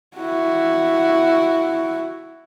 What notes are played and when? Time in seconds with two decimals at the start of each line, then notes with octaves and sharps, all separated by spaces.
0.17 E4 F#4